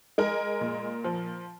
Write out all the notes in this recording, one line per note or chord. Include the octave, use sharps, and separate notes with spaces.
G#3 A#4
A#2
F3